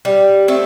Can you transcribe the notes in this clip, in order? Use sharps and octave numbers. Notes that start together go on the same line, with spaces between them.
G3
A3 C4